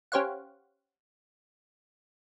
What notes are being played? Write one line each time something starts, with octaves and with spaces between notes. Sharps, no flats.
C#4 G4 C5 C#5 F5 F#5